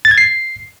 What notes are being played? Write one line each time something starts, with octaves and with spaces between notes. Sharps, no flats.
A6
G#6
C7